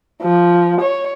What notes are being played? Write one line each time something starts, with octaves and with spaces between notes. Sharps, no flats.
F3
C#5